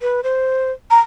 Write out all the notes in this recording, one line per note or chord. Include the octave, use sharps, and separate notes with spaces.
B4
C5
A#5